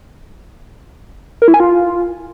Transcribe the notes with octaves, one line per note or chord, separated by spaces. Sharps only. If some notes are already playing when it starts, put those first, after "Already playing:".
A#4
E4
G#5
F4